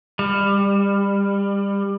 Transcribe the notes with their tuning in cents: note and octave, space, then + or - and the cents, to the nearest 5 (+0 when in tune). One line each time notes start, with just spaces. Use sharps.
G3 +25